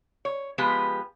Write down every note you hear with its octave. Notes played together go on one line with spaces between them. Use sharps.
C#5
F3 G#3 B3 G4 B4